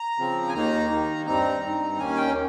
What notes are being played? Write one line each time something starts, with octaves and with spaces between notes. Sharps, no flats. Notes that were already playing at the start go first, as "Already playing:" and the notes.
Already playing: A#5
C#3 F3 C4
G#5
D#2 D#3 A#3 D#4 A#5
D#2 D#3 A#3 D#4
G2 G3 C4 D#4 A#5
G2 G3 C4 D#4
D#2 D#3 A#3 C#4 G#5
G5